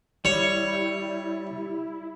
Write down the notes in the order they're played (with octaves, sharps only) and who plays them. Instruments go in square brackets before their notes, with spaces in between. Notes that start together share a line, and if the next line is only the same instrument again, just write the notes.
[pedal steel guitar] G3 [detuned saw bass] E4 [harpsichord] C#5